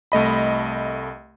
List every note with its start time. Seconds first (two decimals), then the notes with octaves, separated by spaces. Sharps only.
0.12 C2 A3 D#5 B5